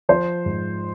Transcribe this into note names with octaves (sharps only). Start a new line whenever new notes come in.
F3 C5
G#2